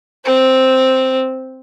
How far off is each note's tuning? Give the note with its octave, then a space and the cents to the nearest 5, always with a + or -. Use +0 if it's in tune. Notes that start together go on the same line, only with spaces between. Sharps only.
C4 +0 C5 +0